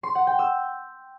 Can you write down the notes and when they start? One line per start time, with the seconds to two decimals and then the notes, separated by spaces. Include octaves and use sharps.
0.03 C6
0.15 F#5
0.27 G5
0.39 E6